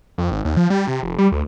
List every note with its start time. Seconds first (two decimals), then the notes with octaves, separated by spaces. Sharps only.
0.18 F2
0.32 G#1
0.45 D#2
0.57 F3
0.70 G3
0.87 C3
1.03 F1
1.18 G3
1.32 D2